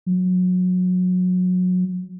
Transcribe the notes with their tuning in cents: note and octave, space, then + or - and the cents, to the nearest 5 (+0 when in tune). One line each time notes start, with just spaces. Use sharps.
F#3 -25